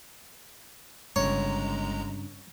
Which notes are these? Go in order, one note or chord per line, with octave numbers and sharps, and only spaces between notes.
G1 G2 C#3 G#3 C#5 A#5